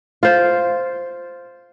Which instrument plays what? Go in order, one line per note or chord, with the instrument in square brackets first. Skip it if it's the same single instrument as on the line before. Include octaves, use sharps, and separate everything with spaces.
[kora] F4 C5